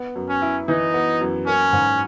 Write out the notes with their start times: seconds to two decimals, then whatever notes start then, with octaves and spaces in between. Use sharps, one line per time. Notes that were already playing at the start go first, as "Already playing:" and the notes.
Already playing: B3
0.16 F#2
0.29 C#4
0.42 E4
0.68 E3 D#4
0.94 B3
1.21 F#2
1.47 A#3 C#4
1.73 G#2